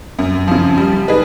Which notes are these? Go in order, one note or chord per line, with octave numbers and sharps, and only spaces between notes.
F#2
C#3 F3
G3
D#4 G#4 B4